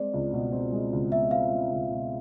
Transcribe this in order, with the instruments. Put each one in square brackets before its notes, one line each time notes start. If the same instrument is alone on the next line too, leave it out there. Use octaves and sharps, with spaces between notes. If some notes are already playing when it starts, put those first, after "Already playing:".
Already playing: [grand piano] G#3 C4 [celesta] D5
[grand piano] C#2
B2
C4
G#3
C#2
[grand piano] B2 [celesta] E5
[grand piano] C4 [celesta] F5
[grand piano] G#3
C#2
B2